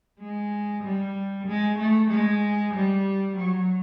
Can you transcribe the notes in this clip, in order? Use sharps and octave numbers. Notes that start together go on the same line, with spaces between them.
G#3
G3
G#3
A3
G#3
G3
F#3